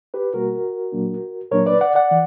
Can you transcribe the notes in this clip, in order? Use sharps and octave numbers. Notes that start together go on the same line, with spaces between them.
G4 B4
B2 G3 A#3 F#4 A#4
A#2 F#3 A#3 D4
A#2 F#3 A#3 D4 A#4 C#5
B4 D5
D5 F#5
D5 F#5
E3